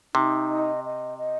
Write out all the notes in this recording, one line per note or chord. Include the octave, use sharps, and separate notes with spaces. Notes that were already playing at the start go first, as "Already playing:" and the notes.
C3 D#4
D#5
D#5
D#5